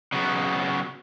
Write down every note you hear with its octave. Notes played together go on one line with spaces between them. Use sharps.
C#3 F#3 B3